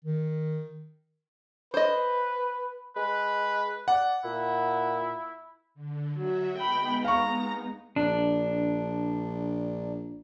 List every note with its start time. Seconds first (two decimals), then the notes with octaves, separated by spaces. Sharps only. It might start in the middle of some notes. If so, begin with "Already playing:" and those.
0.05 D#3
1.74 B4 C5 D#5
2.96 G#3 B4
3.88 D5 F#5
4.25 A#2 E4
5.74 D3
6.17 F#3 F#4 E5
6.58 G#3 B3 D#4 G5 B5
7.05 F5 A#5 C#6
7.96 A#1 D4